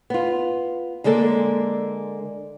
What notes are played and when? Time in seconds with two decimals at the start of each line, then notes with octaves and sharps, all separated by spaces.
0.10 B3 F4
1.04 D3 G#3 A#3 A4 D5